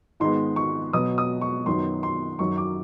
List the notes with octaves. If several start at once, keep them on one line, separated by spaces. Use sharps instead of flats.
G#2 D#3 G#3 B3 C6
C#6
B2 F#3 B3 D#6
D#6
C#6
F#2 D#3 F#3 B3 C6
C6
F#2 D#3 F#3 C#6
D6